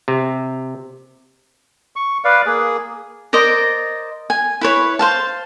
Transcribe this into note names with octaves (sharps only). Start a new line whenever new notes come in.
C3
C#6
B4 D5 F5
A#3 G#4
A#4 C5 D5 D#5
G#5
E4 B4 C#5
C5 F5 A5